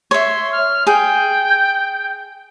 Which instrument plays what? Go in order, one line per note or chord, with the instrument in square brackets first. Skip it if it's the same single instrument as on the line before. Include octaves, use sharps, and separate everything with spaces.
[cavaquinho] C#5 E5 [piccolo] C6
[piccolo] F6
[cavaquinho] G#4 [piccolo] G5